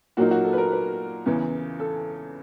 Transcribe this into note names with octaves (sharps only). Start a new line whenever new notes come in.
A#2 F#3 A#3 D#4 F#4
F#4
A4
B4
A#4
B4
E2 C#3 E3
A4